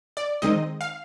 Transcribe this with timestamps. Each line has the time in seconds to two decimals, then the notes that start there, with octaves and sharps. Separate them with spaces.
0.17 D5
0.42 D#3 G#3 C4 D#4 D#5
0.81 F5